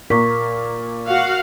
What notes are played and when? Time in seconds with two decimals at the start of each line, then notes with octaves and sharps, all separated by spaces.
0.10 A#2 A#4 A#5 C#6 B6
1.06 F#4 F5 F#5